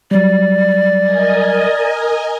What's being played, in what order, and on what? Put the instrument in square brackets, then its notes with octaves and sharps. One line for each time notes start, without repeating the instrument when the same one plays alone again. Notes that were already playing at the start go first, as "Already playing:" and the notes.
[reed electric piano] F#3 G3 [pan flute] D5
[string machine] A#4 D#5 G#5